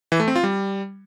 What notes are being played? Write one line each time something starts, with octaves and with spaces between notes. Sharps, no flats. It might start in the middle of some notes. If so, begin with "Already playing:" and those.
E3
A3
C4
F4
G3